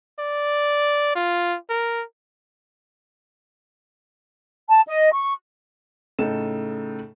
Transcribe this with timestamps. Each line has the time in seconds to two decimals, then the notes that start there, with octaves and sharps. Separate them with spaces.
0.19 D5
1.16 F4
1.70 A#4
4.69 A5
4.87 D#5
5.13 C#6
6.19 A2 C#3 D#4 A4 E7